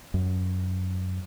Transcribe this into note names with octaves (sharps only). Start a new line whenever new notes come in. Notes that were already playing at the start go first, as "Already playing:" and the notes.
F#2